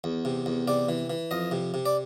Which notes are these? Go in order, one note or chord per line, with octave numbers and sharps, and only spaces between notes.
E2
C3
E2
C3 D5
E3
E3
F2 D#5
C3
C3
D5